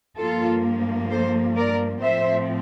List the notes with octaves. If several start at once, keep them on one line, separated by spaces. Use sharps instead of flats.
G2 F3 A#3 F4 A4
A4 C5
A#4 D5
A2 F3 C4 C5 E5